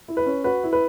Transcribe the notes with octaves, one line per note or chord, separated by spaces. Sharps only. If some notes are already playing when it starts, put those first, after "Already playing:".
E4
B4
C#4
F#4 B4
E4
B4